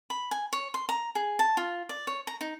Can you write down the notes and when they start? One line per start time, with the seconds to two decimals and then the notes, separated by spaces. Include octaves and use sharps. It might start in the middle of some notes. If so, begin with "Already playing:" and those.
0.10 B5
0.31 G#5
0.53 C#5
0.74 C6
0.89 A#5
1.15 G#4
1.39 A5
1.57 F4
1.89 D5
2.07 C#5
2.27 A#5
2.41 D#4